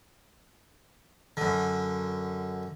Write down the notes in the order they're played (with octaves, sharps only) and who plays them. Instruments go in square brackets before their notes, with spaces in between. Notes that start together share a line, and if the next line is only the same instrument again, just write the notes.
[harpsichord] F#2 D3